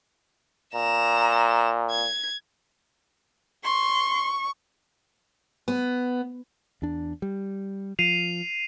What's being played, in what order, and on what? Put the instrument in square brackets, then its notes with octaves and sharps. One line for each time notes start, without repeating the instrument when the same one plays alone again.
[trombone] A#2 [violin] A#5 E7
[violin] G#6
[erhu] C6 [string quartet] C#6
[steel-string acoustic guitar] B3
[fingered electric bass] E2 D4
G3
[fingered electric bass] F3 [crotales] C7 D#7 F7